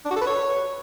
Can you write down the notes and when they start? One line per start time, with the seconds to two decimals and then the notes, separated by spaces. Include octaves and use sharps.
0.05 D4
0.11 F#4
0.16 A4
0.21 B4
0.27 C#5